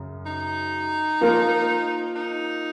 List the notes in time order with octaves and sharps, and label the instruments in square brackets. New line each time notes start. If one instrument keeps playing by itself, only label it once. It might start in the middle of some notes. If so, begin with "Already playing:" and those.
Already playing: [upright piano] F#2 C#3
[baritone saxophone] D#4
[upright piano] F3 A#3 F4 A#4
[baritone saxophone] D#4